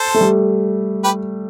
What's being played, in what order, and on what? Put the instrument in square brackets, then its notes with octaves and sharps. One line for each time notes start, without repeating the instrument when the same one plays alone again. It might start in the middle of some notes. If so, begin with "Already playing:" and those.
Already playing: [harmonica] A4 C5
[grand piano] A3
G3
[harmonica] G4 B4